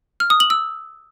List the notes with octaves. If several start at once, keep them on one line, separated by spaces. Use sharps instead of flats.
F6
D#6
F#7
E6